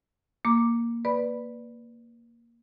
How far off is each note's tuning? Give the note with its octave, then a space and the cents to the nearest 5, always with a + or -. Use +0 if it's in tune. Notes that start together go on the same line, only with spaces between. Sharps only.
A#3 +0 A#5 +0 D6 +0
B4 +0 D5 +0 B5 +0